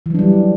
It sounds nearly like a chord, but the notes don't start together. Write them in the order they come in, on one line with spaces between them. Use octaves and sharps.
E3 F#3 D4 G3